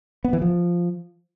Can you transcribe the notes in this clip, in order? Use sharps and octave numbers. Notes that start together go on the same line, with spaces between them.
B3
E3
F3